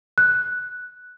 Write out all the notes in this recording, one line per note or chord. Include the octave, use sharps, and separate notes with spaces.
F#6